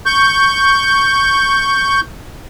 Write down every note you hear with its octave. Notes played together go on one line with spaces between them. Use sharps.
C#6 G6